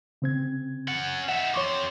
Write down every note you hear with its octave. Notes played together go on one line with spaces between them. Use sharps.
C#3 C4 G#6
C#4 F#5
D#4 E5 F#5
F2 C5 C#5 C#6 D6